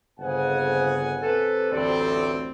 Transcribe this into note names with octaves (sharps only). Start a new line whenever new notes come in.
G1 F2 C#3 F#5 G#5
C3 A4 B4
A1 D2 G3 C4 A4 D5